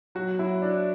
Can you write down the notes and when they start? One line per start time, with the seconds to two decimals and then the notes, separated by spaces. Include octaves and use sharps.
0.15 F#3 F#4
0.39 F#3 E4
0.62 D4 E4